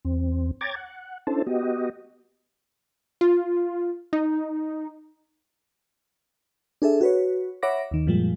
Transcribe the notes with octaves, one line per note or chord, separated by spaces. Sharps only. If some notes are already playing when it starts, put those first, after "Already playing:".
E2 C4
C#5 G5 A#5 D6 G#6 A6
F#5
C#4 D4 E4 A4 C5 A5
B3 F#4 G4 D#5
F4
D#4
D4 G#4 A4 E5
F#4 B4 C#5
C#5 E5 F#5 B5 D6 A#6
D#2 D#3
F#2 A#2 F3 G3 G#3